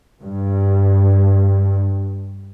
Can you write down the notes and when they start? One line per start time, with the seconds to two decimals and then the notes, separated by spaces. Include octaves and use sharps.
0.23 G2